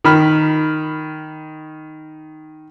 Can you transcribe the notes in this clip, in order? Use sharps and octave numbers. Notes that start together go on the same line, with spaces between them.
D#3 B5 F6